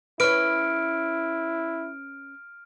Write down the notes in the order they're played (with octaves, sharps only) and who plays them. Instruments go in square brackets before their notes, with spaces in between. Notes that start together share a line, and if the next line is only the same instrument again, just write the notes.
[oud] C#4 B4 [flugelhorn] E4 [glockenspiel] F6 D7